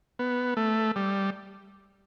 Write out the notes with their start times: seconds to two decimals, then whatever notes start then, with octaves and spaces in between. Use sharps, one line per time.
0.19 B3
0.57 A3
0.96 G3